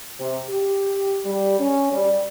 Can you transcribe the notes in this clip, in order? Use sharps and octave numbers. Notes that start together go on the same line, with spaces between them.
C3
G4
G3
C#4
G3